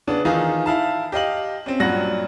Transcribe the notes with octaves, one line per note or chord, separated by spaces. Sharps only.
C#3 B3 D4
D#3 E3 D#4 F4 G#4
E4 F5 A5
G4 D#5 F5 F#7
C4 C#4
G2 A#2 F#3 F#5 A#6